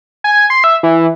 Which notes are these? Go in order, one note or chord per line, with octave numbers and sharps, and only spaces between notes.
G#5
C6
E5
E3